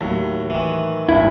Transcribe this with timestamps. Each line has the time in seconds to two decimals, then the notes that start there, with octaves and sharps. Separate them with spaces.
0.01 D#2 A2 F#3
0.50 D#3 E3
1.09 G#1 G2 A#2 E4